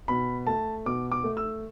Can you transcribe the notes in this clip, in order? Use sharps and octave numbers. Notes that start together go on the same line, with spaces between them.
B2 B5
A3 A5
B2 D6
D6
A3
E6